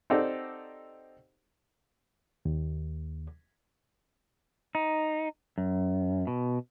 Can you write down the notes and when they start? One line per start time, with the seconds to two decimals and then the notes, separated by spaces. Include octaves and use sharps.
0.10 C4 D#4 G4 A4 D5 F#5
2.45 D#2
4.75 D#4
5.58 F#2
6.27 B2